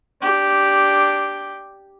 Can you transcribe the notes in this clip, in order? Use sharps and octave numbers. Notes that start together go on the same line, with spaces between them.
D4 G4